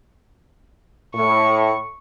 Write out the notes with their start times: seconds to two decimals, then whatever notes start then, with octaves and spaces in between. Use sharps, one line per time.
1.15 A2 C#6